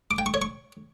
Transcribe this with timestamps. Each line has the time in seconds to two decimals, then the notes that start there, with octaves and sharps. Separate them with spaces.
0.11 D6
0.18 G5
0.26 C#6
0.34 C#5
0.42 C#6